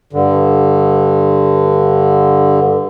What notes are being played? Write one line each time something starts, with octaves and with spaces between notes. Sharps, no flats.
G2 D3